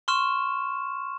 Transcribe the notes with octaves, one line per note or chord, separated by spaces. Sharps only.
C6 C#6 F6 E7